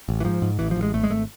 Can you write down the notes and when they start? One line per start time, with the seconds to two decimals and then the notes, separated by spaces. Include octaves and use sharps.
0.09 A1
0.20 E3
0.25 G#2 F3
0.42 G#2
0.59 A1 E3
0.71 F3
0.76 A1
0.82 G#3
0.94 G#1 A3
1.03 G#3
1.10 G#1 A3